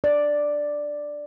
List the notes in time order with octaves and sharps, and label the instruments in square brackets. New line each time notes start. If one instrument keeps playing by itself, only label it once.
[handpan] D5